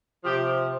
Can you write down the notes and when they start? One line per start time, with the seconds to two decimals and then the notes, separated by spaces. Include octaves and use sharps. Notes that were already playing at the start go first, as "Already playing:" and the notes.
0.23 C3 F3 G4